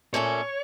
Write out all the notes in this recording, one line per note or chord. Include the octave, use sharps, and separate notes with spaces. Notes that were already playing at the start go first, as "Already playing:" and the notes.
A#2 A3 C#4 C#5